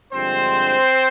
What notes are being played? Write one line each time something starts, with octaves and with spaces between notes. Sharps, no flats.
G2 D3 F3 G#3 C4 C5